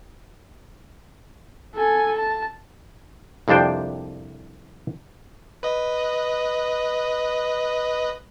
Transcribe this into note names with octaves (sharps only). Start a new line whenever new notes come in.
A4 G#5
A5
C2 F2 C3 D4 C5 G5
B4 D#5